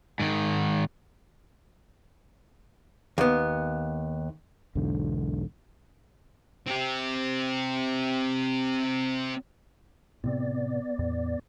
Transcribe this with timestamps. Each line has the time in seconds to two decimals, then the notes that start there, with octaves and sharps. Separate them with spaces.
0.20 G#2 D#3
3.18 D#2 B3
4.75 B1 E2 G#2 D3
6.66 C4 G4
10.24 A2 C3 B3 C4 D5
10.99 E2 A2